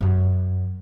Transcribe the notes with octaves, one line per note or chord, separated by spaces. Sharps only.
F#2 F#3